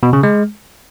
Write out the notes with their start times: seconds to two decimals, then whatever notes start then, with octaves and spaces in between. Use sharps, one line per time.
0.03 B2
0.13 C#3
0.23 G#3